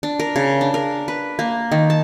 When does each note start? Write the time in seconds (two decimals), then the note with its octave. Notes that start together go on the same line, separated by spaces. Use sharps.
0.03 D4
0.19 A#4
0.36 C#3
0.61 D4
0.74 A#4
1.08 B4
1.39 A#3
1.72 D#3
1.90 A5